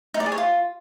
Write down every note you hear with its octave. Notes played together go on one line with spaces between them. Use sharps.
D#4
D5
G#4
C#5
F4